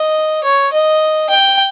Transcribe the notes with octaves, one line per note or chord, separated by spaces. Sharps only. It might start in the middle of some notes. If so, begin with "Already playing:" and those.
Already playing: D#5
C#5
D#5
G5